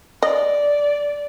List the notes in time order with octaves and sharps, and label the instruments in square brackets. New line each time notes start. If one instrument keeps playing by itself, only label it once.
[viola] D5 [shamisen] D#5